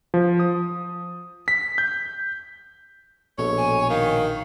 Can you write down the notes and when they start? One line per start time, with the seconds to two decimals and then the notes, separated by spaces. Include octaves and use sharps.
0.14 F3
0.39 D#6
1.48 B6
1.78 G6
3.38 A#1 B2 A4 C#5
3.57 G#5
3.89 D#3 F5